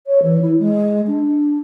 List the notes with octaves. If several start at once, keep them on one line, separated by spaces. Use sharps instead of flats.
C#5
E3
E4
G#3
D4